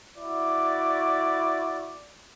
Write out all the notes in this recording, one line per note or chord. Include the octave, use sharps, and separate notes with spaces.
E4 F#4 D5